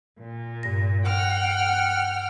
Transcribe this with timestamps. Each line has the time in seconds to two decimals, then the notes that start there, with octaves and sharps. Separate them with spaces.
0.18 A#2
0.63 G2 A#6
1.05 F#5 G5 F6